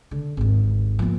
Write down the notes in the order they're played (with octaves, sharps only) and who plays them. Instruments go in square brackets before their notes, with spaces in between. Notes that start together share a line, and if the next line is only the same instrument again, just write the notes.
[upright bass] D3
G#1 D#2
F3 A#3